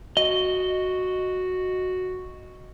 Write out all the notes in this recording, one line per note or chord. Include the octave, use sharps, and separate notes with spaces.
F#4 D#5